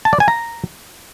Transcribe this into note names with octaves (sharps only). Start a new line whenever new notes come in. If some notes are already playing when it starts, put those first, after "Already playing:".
A5
D5
G#5
A#5